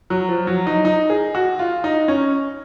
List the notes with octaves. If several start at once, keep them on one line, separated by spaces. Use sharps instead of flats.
F#3
F3
F#3
D#4
D#4
G#4
F#4
F4
D#4
C#4